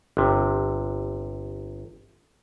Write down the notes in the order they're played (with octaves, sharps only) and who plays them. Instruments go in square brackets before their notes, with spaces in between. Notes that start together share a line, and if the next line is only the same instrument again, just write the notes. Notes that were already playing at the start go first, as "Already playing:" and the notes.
[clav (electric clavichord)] G1 C3